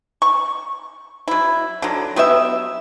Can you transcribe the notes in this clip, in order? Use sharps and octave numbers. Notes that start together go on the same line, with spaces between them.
C#6
F#3 E4
D3 F#3
F#3 B3 G4 E5